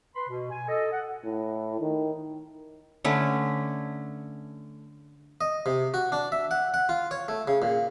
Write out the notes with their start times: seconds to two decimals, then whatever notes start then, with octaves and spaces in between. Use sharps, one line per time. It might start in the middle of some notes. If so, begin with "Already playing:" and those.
0.15 B4 B5 C6
0.29 B2
0.51 G#5
0.68 A4 D#5
0.92 F#5
1.25 A2
1.81 D#3
3.05 D3 A3 C#4 B4
5.41 D#5
5.66 C3
5.94 F#4
6.12 D4
6.32 E5
6.51 F#5
6.74 F#5
6.89 F4
7.11 C#5
7.28 A3
7.48 C#3
7.62 A#2